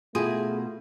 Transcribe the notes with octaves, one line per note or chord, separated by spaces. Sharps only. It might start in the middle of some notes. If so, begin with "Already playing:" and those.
B2 A3 E4 F4 G#4